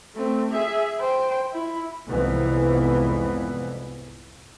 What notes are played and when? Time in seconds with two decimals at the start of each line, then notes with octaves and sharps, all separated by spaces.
0.15 A3 C4
0.51 G#4 E5
1.00 C5 G5
1.52 E4
2.10 C2 F2 G#2 E3 B3